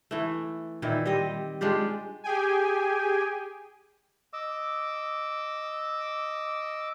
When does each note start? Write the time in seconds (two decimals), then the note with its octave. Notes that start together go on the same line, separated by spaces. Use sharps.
0.11 E3 A3
0.82 A#2 D#3 E3 E4
1.06 G3 C4 D#5
1.61 G#3 D4 F4 G4
2.24 G4 G#4 G5 G#5
4.33 D#5 D6 E6